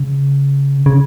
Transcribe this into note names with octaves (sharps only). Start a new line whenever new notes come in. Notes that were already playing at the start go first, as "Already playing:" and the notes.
Already playing: C#3
C#3